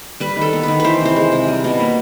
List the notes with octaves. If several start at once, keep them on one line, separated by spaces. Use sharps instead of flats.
G3 B4
D#3 A4
B3
D#3 B4
E3 B4 C5
C3 C5
G#3
C3
G3
B2
A#3